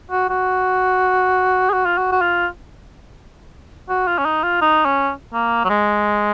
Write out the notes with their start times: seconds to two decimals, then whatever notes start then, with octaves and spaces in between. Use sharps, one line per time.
0.11 F#4
0.29 F#4
1.69 G#4
1.73 F#4
1.86 F4
1.97 F#4
2.12 F#4
2.21 F4
3.89 F#4
4.07 F4
4.18 C#4
4.25 D#4
4.43 F4
4.61 D#4
4.85 C#4
5.33 A#3
5.64 F#3
5.69 G#3